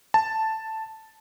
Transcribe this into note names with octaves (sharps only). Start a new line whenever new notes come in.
A5